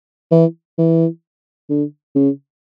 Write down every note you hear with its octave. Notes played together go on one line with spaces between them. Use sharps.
E3
E3
D3
C#3